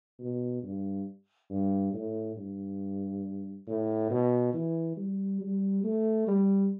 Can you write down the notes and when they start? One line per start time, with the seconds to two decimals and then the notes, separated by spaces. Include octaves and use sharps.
0.19 B2
0.63 G2
1.50 G2
1.94 A2
2.37 G2
3.67 A2
4.11 B2
4.54 E3
4.97 G3
5.41 G3
5.84 A3
6.28 G3